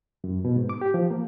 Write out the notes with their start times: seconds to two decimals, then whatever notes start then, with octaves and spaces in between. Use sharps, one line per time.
0.24 F#2
0.45 B2
0.56 G#2
0.69 D6
0.81 G4
0.94 F3
1.11 A#3